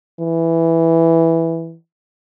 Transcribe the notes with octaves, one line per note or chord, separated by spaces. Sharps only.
E3